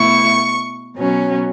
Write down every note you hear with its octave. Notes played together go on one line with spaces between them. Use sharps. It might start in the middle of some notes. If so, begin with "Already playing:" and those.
Already playing: B2 A3 E4 C#6
B2 F#3 C#4